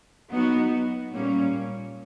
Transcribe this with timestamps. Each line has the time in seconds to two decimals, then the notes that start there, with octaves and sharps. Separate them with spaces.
0.30 F#3 B3 D#4 F#4
1.12 A#2 G3 A#3 C#4